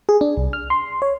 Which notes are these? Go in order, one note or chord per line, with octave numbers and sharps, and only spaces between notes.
G#4
D4
C2
F6
C6
C#5